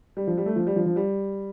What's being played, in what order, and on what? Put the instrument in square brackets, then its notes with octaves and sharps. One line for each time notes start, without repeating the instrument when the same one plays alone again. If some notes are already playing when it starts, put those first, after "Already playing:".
[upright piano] G3
F3
G3
A3
F3
G3
F3
F3
G3